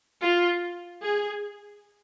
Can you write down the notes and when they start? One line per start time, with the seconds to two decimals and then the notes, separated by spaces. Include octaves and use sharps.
0.21 F4
1.02 G#4